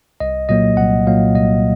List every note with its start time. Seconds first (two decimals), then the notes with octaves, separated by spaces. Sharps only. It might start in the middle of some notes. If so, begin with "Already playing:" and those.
0.20 C2 D#5
0.49 A#2 F#3 A#3 D#5
0.77 C2 F#5
1.06 A#2 F#3 A#3 F5
1.35 C2 D#5